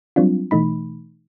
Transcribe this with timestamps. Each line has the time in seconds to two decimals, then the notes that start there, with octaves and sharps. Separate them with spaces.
0.16 F#3 G3 C4 D4 F4
0.51 B2 E3 A3 D#4 B5